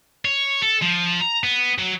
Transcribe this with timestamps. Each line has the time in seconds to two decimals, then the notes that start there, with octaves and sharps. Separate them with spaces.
0.25 C#5
0.62 A4
0.82 F3
1.21 A#5
1.44 B3
1.78 F#3